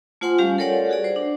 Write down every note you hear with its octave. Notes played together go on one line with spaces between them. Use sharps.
A3 F4 C5 F#5 G#5 C6
G3 C#4 G4 F5 G#5
A4 A#4 C#5 D5 F#5
F#4 G#4 D5
C5
D4